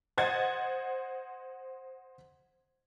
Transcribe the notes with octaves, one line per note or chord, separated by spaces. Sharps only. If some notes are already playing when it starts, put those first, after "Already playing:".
C5 D#5 F#5 G#6 A6